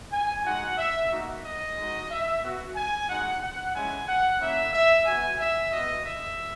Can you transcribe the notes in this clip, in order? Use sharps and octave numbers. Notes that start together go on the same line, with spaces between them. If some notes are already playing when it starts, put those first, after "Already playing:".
G#5
G#3 D#4 F#4 F#5
E5
A#3 D#4 F#4
D#5
G#3 D#4 F#4
E5
B3 F#4
G#5
G#3 D#4 F#4 F#5
F#5
G#3 C#4 E4 G#5
F#5
A#3 C#4 E4 E5
E5
B3 F#4 G#5
E5
B3 F#4 D#5
E5